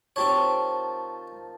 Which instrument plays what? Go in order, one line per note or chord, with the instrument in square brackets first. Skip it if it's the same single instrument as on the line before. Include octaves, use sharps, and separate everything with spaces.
[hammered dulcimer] D#3 F3 A5 [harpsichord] C4 G4 C#5